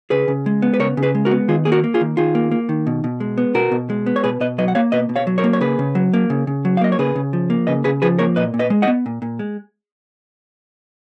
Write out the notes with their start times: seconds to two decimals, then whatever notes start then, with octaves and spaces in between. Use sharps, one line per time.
0.10 C#3 G#4 B4
0.28 C#3
0.46 G#3
0.62 B3
0.74 B4
0.80 C#3 A#4 C#5
0.97 C#3
1.03 G#4 B4
1.15 G#3
1.25 F#4 A#4
1.31 B3
1.48 D#3 F4 G#4
1.65 A#3 G#4
1.72 F#4 A#4
1.84 A#3
1.94 F4 G#4
2.01 D#3
2.17 D#3 F4 G#4
2.35 A#3
2.51 A#3
2.69 D#3
2.87 B2
3.04 B2
3.20 G#3
3.38 B3
3.54 B2 F#4 A#4
3.72 B2
3.90 G#3
4.06 B3
4.16 C#5
4.24 B2 G#4 B4
4.40 B2 B4 D#5
4.58 F#3 B4 D#5
4.68 F#5
4.75 A#3 C#5 F5
4.92 B2 B4 D#5
5.09 B2
5.16 C#5 F5
5.27 F#3
5.38 A#4 C#5
5.44 A#3
5.53 C#5
5.61 C#3 G#4 B4
5.79 C#3
5.95 F#3
6.13 A#3
6.30 C#3
6.47 C#3
6.65 F#3
6.77 F5
6.81 A#3 D#5
6.92 C#5
6.99 C#3 G#4 B4
7.16 C#3
7.33 F3
7.50 A#3
7.67 C#3 B4 D#5
7.84 C#3 G#4 B4
8.02 F3 G#4 B4
8.19 A#3 A#4 C#5
8.36 A#2 B4 D#5
8.54 A#2
8.59 B4 D#5
8.70 G#3
8.82 D#5 F#5
8.87 B3
9.06 A#2
9.22 A#2
9.39 G#3